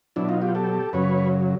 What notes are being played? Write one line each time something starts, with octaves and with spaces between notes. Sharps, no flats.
B2 F#3 D4 E4
D#4 F4
F4 G4
G4 A4
F#2 C#3 F#3 B4 C#5